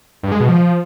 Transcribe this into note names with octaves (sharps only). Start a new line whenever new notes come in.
G2
G#3
B2
F3